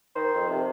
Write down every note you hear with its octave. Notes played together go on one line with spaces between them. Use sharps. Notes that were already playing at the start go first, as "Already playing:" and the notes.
D#3 C5
F2
C3